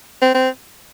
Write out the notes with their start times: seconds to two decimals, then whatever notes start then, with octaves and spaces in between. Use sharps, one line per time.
0.22 C4
0.35 C4